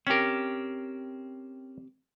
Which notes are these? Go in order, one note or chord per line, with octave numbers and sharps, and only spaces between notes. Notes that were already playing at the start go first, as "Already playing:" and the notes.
C4 C#4 G4 A#4